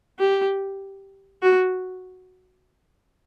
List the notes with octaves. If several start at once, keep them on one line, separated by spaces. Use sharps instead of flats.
G4
F#4